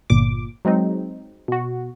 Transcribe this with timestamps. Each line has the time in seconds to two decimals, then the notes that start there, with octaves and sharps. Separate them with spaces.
0.10 G1 A#2 D6
0.65 F#3 G#3 C4 D#4
1.48 B2 F#4